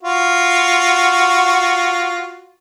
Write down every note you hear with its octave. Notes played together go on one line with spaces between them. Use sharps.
F4 F#4